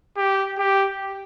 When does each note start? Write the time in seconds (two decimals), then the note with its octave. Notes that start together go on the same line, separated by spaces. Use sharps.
0.17 G4
0.58 G4